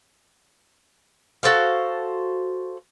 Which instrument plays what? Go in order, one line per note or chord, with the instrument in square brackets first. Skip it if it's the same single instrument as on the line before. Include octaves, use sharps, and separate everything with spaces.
[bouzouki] F#4 A4 C5 F5